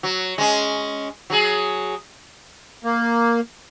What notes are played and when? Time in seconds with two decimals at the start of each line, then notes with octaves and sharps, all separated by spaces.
0.03 F#3
0.38 G#3 C#4
1.30 F#3 G#4
2.84 A#3